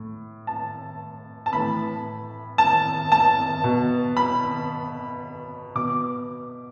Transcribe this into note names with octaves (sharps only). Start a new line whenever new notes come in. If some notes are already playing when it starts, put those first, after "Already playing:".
Already playing: A2
A5
A5
A2 E3 B5
A5
A5
B2
B5
B2 D6